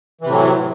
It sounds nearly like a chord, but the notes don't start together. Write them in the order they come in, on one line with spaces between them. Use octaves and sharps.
E3 C3 A2 F#3